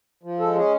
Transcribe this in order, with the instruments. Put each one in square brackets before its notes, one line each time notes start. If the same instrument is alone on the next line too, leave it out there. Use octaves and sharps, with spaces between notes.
[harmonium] F3
G#3 A4
C#4 G#4